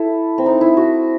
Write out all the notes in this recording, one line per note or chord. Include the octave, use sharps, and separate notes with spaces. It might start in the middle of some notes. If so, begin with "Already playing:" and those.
Already playing: E4 A4
C4
D#4
E4
F#4